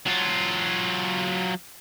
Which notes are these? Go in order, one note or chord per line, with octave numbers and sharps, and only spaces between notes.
F#3 F4